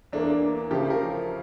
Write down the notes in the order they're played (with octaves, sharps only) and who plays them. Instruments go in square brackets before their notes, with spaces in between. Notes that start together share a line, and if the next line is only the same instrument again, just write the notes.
[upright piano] E2 E3 A#3 [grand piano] D4
[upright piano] C#3 F3 A3 [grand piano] G4
[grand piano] A#4